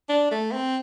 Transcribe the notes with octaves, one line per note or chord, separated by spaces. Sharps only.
D4
A3
C4